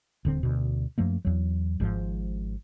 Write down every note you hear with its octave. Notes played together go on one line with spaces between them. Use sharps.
D#1 D3 C4
D2 B2
F#2 F3 A3 A#3
E2 F#3
G#1 G#2 F3